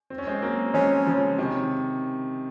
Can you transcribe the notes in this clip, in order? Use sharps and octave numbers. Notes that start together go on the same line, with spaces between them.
C4
C#4
G#3 C4
F#3 A#3
F3 G#3 C#4
C#3 F3
C3 D#3